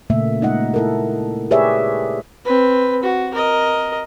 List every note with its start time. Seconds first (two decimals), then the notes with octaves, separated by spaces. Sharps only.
0.10 A#2 C#3 A3 A#3 E5
0.41 G#3 D#4 D#5 F#5
0.74 E4 A4 A#4
1.51 G4 G#4 B4 C#5 D5 E5
2.45 C4 B4
3.04 F#4
3.34 A#4 D#5